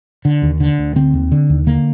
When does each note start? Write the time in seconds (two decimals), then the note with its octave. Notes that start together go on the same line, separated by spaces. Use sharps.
0.25 D3
0.42 D#2
0.60 D3
0.78 D2
0.96 D3 C4
1.14 D#2
1.32 D3
1.49 D#2
1.67 D3 A#3